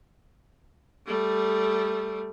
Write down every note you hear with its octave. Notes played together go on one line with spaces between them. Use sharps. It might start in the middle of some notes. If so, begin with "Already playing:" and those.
G3 A3